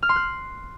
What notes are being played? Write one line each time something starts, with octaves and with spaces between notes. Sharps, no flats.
F6
C6
F#6